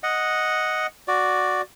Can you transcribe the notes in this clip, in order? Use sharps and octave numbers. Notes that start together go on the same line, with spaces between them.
D#5 F#5
F#4 D5